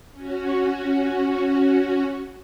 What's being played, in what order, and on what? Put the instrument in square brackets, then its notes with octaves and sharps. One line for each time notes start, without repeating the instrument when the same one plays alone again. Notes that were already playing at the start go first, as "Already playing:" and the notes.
[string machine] C#4 F#4